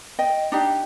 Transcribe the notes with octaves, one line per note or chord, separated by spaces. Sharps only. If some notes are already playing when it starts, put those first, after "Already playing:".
D#5 G5
D4 D#4 G4